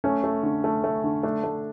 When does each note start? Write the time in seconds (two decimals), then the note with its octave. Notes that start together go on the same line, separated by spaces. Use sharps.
0.04 A3 C#4
0.24 A3
0.43 D3
0.64 A3
0.84 A3
1.04 D3
1.23 A3 D4
1.44 A3